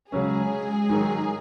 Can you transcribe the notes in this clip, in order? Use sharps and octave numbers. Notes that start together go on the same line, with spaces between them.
C#3 F#3 G#3 C#4 G#4
G#2 D#3 F#3